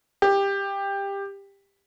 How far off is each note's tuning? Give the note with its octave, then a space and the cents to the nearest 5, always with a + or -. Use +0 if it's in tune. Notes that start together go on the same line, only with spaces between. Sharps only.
G4 +15